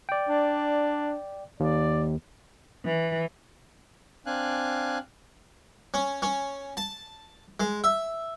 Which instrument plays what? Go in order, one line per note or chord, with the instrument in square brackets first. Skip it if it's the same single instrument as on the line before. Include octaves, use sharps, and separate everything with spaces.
[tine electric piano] D5 G5
[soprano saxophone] D4
[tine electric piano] D#2 [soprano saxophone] D5
[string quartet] E3
[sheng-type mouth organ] C4 D4 F5 G#5 F#6
[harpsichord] C#4
C#4
A5
G#3
E5